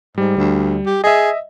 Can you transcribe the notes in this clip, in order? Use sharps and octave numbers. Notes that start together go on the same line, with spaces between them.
G#2 G3
D2
G4
G#4 D#5 E5